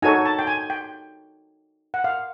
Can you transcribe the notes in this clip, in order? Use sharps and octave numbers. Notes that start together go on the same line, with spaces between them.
D#4 F#4 A4 C#5 G#5
A5
G5
G#5
G5
F#5
F5